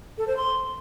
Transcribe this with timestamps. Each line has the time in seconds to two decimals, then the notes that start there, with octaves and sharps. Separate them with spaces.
0.18 A4
0.27 C5
0.37 C6